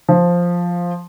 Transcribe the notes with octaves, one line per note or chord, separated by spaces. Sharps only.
F3